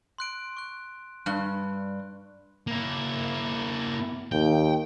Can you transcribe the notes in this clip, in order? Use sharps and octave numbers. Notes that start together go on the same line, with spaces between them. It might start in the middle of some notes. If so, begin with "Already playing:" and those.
C6 F#6 D7
C#6 F#6
G2 F#6
A#3 E4
D#2 G5